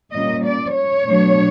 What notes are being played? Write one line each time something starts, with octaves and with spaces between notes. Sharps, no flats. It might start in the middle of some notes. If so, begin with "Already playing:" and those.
A#2 G3 A#3 C#4 D#5
D5
C#5
B2 F#3 A3 D4